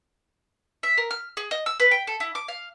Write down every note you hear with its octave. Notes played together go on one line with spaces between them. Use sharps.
E5
A#4
F6
G#4
D#5
E6
B4
G5
A4
E4
D6
F5